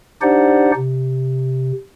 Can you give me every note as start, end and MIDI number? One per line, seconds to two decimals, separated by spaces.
0.22 0.72 62
0.22 0.72 63
0.22 0.72 67
0.22 0.72 72
0.22 0.72 74
0.22 0.72 78
0.76 1.72 48